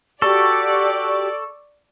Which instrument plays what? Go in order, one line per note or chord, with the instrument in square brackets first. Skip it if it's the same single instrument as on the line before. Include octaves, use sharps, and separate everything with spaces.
[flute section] F#4 G4 [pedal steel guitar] A4 [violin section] D5 [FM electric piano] C#6